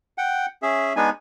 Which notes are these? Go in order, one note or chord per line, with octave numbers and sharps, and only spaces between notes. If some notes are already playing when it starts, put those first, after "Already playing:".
F#5 G5
C#4 G#4 E5
G#3 B3 D4 D#4 G#5